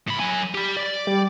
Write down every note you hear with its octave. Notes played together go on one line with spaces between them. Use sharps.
A2 B5
F#3 G#5
G4 B5
D5
G3